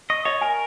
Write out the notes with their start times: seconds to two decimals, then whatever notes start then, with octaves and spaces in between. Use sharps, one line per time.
0.10 D#5 C#6
0.25 C#5 D#5
0.41 A#4 G#5